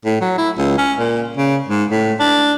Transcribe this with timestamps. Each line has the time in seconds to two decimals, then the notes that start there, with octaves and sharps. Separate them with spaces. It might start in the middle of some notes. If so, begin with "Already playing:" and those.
0.05 A2
0.21 F#3
0.38 E4
0.58 C#2
0.78 C#4
0.99 A#2
1.37 C#3
1.68 G#2
1.91 A2
2.19 D4